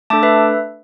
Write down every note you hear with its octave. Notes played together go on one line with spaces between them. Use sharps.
A3 D4 A4 A5 D6
B4 E5